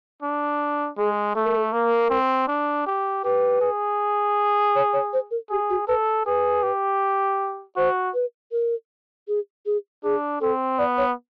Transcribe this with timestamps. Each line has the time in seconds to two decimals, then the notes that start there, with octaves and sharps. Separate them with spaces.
0.22 D4
0.97 G#3 G#4
1.35 A3 A4
1.45 A#4
1.57 A4
1.72 A#3 A#4
2.10 C4
2.48 D4
2.87 G4
3.24 G4 B4
3.61 G#4
4.75 C#5
4.93 C#5
5.13 C5
5.31 A#4
5.50 G4 G#4
5.70 F#4
5.88 A4 B4
6.26 G#4 B4
6.63 G4
7.76 F#4 C5
8.14 B4
8.52 A#4
9.28 G#4
9.66 G#4
10.03 D4 G#4
10.41 C4 A4
10.78 B3 D5
10.98 C#5